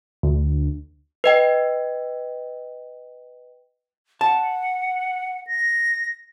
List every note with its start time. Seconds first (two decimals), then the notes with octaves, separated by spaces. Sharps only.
0.23 D2
1.24 B4 D#5 G5
4.21 F#5 A5
5.47 A#6